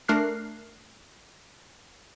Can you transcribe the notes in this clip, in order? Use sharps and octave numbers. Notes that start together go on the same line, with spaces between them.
A3 D4 A#4 F6 F#6 C7